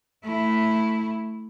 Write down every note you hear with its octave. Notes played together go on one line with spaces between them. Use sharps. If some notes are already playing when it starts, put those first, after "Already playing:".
A3 E4